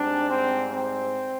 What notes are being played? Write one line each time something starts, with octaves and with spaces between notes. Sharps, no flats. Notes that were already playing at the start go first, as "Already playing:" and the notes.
Already playing: G#2 G3 C4 D4
C4
C4